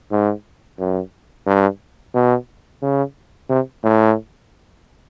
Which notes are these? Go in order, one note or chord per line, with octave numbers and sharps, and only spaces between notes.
G#2
F#2
G2
B2
C#3
C3
A2